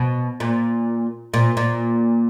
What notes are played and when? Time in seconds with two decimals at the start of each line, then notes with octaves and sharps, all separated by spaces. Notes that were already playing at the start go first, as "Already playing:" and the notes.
Already playing: B2
0.40 A#2
1.34 A#2
1.57 A#2